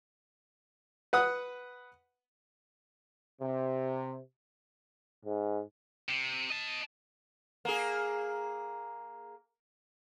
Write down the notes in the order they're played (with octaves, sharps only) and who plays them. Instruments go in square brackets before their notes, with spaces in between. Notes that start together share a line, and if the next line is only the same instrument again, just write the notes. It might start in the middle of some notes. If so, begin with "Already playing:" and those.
[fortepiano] B4 F#5 D#6
[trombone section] C3
[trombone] G#2
[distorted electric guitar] C3
D#5 A5
[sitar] A#3 G#4